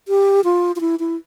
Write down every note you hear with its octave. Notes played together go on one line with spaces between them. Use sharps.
G4
F4
F4
E4
E4